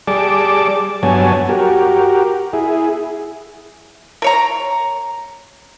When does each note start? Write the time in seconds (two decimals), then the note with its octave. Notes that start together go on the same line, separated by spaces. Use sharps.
0.07 G3 G#4 D5 A5 D6
1.03 G2 F#3 B3 C#5 G#5 A5
1.49 F#4 G4 A#4
2.53 E4 G#4
4.22 A#4 C#5 A#5